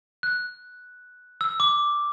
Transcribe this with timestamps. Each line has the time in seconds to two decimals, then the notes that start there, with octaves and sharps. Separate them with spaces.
0.23 F#6
1.41 E6
1.60 D6